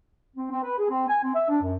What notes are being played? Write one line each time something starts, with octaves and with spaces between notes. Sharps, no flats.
C4
C4
B4
G#4
C4
G#5
C4
E5
D4
F#2